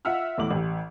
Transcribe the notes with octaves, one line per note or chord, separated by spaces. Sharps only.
F4 E5 F#5 E6 F6
A1 E2 A2 D6 F#7
A1 E3 G4